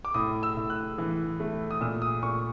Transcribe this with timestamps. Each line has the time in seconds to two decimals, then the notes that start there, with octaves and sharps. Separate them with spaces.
0.05 D6
0.14 A2 D#6
0.43 E6
0.57 A2
0.70 F#6
0.98 E3
1.40 A3
1.71 D#6
1.81 A#2 E6
2.02 D#6
2.23 A#2 C#6